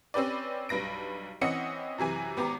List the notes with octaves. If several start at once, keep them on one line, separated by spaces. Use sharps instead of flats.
C4 C#4 G4 B4 D5
B1 G2 B4 A#6 D7
E3 C4 C#4 D#5 F#5 C#7
F#2 C3 E3 G#5
G#1 B3 G4 A#5 D6